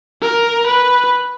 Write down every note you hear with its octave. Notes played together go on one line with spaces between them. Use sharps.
A#4
B4